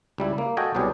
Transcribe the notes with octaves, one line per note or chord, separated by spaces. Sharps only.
C#2 G3 E4
A#3
F#4 A4 D#5 G5 G#5
C2 B2 F#3 G4 G#4 D5